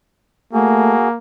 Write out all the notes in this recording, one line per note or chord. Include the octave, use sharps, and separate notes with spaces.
A3 A#3 F#4 G#4